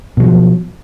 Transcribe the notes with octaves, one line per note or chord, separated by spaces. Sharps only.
B2 F3 F#3